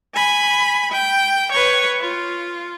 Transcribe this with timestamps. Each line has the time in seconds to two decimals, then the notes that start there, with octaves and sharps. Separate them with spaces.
0.15 G#5 B5
0.91 G5
1.52 B4 C#5
1.99 F4